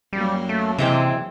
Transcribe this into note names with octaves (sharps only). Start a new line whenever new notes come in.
F#2 F#3 G3 A#3
A3
C3 E3 G#3 C4